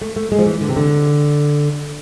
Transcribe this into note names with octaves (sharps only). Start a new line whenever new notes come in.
A3
A3
G#3
F3
E3
D3
C3
D3